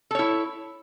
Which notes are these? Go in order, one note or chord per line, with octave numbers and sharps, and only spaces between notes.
E4 A4 C#5